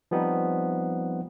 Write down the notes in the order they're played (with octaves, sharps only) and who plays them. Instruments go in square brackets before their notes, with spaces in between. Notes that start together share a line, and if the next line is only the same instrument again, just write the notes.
[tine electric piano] F3 G3 B3 C4 D#4